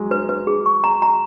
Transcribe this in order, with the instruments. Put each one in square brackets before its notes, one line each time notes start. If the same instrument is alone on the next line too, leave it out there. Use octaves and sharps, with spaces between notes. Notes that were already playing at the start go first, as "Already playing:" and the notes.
Already playing: [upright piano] F#3 G#3
[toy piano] B4
B4
G#4
C#6
A#5
A#5